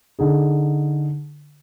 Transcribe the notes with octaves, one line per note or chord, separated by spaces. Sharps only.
D3 D#4 G#4